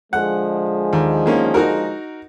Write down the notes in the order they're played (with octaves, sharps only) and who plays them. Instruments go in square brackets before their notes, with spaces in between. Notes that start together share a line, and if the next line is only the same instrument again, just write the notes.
[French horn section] D3 F3 G#3 [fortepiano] F#5
[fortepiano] D#2
D#3 A#3 C#4
D#4 F#4 A#4